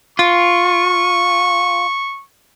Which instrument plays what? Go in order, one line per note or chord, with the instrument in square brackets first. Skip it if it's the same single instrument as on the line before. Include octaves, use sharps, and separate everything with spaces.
[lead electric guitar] F4 [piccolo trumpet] C#6